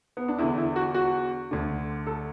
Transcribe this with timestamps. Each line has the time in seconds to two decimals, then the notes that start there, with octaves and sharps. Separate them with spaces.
0.17 B3
0.28 D4
0.38 E2 D3 E4
0.58 E4
0.76 F#4
0.94 F#4
1.51 D2 D3
2.07 A4